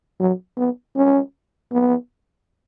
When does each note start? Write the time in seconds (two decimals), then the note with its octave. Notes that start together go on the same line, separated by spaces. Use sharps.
0.20 F#3
0.57 B3
0.96 C#4
1.72 B3